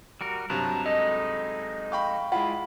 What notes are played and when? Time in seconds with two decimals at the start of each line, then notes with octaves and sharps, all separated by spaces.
0.21 G3 F#4 A#4
0.50 G2 C3 F#3 A5 A#5 F#6
0.86 G#3 D#4 A4 D#5
1.92 F5 G5 B5 C#6
2.32 G#3 E4 F4 F#5 B5